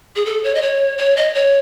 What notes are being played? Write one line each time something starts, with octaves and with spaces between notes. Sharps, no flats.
G#4
A4
C#5
D#5
C#5
C#5
D#5
C#5